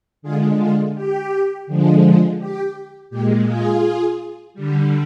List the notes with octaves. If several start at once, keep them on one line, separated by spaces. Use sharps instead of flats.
D3 G#3 F4 G#4
F4
G4
D3 F3 G#3
G4
A#2 G#3 G4
F4 G#4
D3 G3